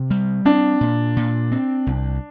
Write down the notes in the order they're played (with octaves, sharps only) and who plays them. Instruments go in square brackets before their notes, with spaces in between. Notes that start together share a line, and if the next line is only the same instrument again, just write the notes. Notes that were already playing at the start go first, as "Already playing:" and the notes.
Already playing: [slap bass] C3
G3
[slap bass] C4 [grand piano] D4
[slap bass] A#2
A#2
C4
C2